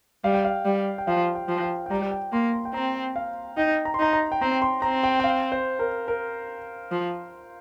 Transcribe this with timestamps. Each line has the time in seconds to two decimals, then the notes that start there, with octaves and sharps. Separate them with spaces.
0.24 G3 F5
0.34 G5
0.44 F5
0.65 G3
0.98 G5
1.07 F3 F5
1.35 G5
1.48 F3
1.63 G5
1.86 G5
1.91 G3 A#5
2.11 G5
2.33 A#3 C6
2.53 C6
2.65 G5
2.74 C4 A#5
3.16 F5
3.57 D#4 G5
3.85 A#5
3.94 C6
3.99 D#4 A#5
4.13 A#5
4.32 G5
4.41 C4 A#5
4.62 C6
4.82 C4 A#5
5.04 G5
5.20 G5
5.24 F5
5.52 C5
5.79 A#4
6.08 A#4
6.91 F3